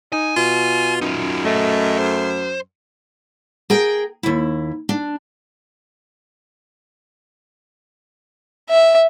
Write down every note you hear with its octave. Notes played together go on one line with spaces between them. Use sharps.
D#4 G#5
B2 F4
F#2 D#4 F4
A3 D#5 F#5
C5
G#4 A#4 G5
D#2 E4
D4
E5